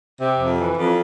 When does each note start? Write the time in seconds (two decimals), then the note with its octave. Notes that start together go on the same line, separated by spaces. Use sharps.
0.21 C3
0.39 F2
0.59 E3
0.78 F2